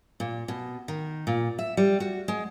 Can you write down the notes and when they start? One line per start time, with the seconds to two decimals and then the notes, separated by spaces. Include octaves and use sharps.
0.20 A#2
0.48 B2
0.88 D#3
1.27 A#2
1.59 E5
1.77 G3
2.00 F#4
2.28 G#3